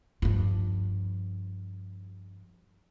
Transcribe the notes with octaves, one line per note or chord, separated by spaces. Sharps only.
G2 F3